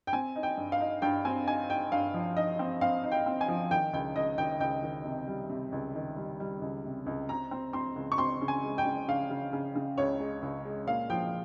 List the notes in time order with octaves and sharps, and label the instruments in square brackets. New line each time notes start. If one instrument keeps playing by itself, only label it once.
[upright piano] G5
C4 G#5
D#4
G5
G2
F5
D#4
G2 G5
C4 G#5
D#4 G#5
D#4 G5
G2 F5
F3
D#4 D#5
C4
C4 F5
D#4
G5
C4
G#5
F3
D#3 G5
C#2 G5
C#2 D#5
D#3 G5
C#2 G5
D#3
C3
G3
C3
C#2
D#3
G3
G3
C#2
C3
C#2
C4 A#5
C4
C4 C6
C#2
C#6
C4 C6
C#3
G#5
G#3
G5
C#3
C#3 F5
C#3
C#3
C#3
C#2 C#5
G#3
C#2
G#3
A#2 F5
F3 G5